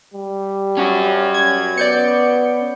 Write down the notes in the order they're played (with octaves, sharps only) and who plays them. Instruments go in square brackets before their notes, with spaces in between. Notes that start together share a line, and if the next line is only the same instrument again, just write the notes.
[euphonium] G3
[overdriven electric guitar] C#4 F#4
[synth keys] G#6
[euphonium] B3 [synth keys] D5 G6 C#7